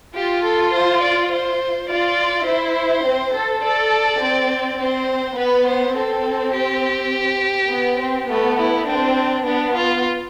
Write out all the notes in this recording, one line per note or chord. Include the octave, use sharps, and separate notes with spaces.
F4 G4
A4
C5
D5
C5
F4 D5
E4 C5
C4
A4
A4 D5
C4
C4 C5
B3 B4
C5
C4 A4
G4
B3
C4
A3 B3
E4
C4 D4
B3 D4
F4